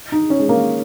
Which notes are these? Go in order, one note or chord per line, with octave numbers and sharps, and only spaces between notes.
D#4
C#4
G#3
A#3